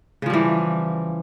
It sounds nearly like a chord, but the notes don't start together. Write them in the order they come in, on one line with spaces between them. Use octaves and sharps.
C#3 F3 G3 E3